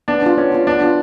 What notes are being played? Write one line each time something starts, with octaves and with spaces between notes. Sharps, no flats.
B3 D4
D4 F4
B3 C#4
D4 F4
B3 D4
D4 F4